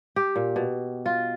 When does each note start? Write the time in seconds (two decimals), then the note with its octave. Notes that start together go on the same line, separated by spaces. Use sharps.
0.16 G4
0.36 A#2
0.56 B2
1.06 F4